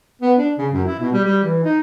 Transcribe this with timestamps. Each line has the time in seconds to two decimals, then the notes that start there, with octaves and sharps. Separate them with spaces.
0.21 B3
0.38 D4
0.58 C#3
0.73 F#2
0.85 E4
0.99 B2
1.13 G3
1.24 G3
1.43 E3
1.64 D#4